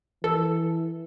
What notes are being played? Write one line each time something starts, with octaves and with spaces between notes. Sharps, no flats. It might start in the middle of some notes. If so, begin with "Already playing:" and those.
E3 A4